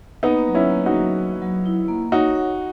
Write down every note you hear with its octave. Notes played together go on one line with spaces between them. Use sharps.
A#3 B3 D#4
F#3
C#4 E4
A#3
D#4 F#4
F#3
A#3
F#3
E4
A#3
D#4 F#4 C#5
F#5